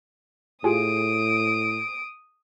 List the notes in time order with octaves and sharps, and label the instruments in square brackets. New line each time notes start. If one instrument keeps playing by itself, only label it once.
[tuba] A2 [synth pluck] F4 G4 G#4 [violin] D#6 D7